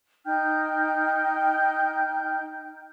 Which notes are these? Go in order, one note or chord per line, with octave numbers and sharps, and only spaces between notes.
D#4 G5 F6 G6